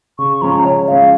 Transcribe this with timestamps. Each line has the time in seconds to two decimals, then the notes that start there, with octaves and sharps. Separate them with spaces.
0.18 C#3 C#6
0.42 F3 G#3 C#4 A#5
0.65 C#3 C#5
0.88 F3 G#3 C#4 F5